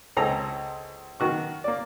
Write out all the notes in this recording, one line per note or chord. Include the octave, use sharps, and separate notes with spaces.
C#2 C4 A4 G#5 A#5
D#3 F#4 C#6
A#3 D5